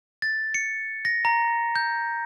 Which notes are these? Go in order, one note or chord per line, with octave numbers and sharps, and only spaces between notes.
A6
C#7
A#6
A#5
G6